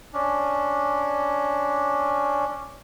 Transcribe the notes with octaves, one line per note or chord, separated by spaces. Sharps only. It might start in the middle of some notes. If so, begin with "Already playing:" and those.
C#4 D4